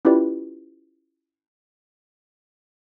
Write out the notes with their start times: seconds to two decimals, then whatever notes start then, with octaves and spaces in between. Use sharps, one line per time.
0.05 C#4 E4 F4 G4 B4 D5